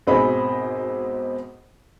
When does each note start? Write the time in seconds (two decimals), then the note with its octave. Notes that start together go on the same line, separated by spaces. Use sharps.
0.07 G#1 B2 C4 G#4 D#5 B5